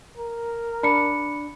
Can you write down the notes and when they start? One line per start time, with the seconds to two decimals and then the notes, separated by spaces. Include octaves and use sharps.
0.18 A#4
0.83 D4 B5 C#7